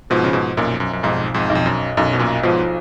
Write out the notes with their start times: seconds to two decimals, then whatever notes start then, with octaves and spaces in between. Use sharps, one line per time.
0.10 G#2 B2 F3
0.24 C#3
0.33 G#2 B2
0.57 B1 F#2 A#2
0.80 F#2
0.93 F#2
1.03 B1 F2 G#2
1.34 F2 G#2
1.50 B1
1.55 F2
1.66 F#2
1.97 B1 F#2
2.13 B2
2.19 F#2 A#2
2.43 G#2 B2 F3